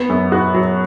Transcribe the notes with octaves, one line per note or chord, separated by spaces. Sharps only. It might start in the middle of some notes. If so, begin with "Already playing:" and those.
Already playing: B3
F#2
F#4
F#3